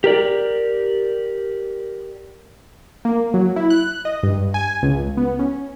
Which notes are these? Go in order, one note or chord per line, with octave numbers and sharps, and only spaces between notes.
G4 A#4 D5
A#3
F#3
E4
F#6
D#5
G2
G#5
C#2
B3
C#4